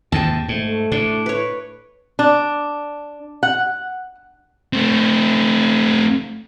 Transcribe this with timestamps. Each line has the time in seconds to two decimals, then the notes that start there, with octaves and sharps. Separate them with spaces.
0.12 D#2 G#2 C3 G5 A5
0.48 G#2 A3
0.92 A2 D4
1.26 B4 C#5
2.19 D4
3.43 F#5
4.73 A3 C4